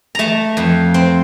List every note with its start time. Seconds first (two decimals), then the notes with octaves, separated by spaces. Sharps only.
0.15 A3 A5 A#5
0.57 F2
0.94 C4